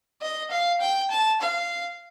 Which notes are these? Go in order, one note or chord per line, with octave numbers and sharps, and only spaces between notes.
D#5
F5
G5
A5
F5